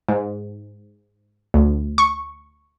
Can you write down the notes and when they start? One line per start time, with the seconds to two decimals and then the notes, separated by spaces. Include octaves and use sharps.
0.09 G#2
1.54 D2
1.98 C#6